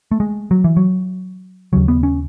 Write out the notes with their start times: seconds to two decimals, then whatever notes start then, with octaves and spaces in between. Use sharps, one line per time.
0.11 A3
0.20 G#3
0.51 F#3
0.64 E3
0.77 F#3
1.73 D#2 C#3 F#3
1.88 B3
2.03 C#4